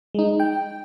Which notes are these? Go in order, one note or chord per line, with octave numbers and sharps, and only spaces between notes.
G#3 D#4
G5